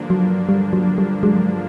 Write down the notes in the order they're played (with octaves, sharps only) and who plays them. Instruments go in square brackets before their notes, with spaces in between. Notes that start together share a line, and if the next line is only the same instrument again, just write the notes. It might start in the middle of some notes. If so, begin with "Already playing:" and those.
Already playing: [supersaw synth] G2 D3 F3 A#3 D4
[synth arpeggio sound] F#3
G3
F#3
G3
F#3 G#3